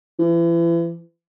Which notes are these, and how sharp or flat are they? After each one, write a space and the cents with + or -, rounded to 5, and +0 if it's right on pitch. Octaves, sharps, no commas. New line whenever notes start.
E3 +35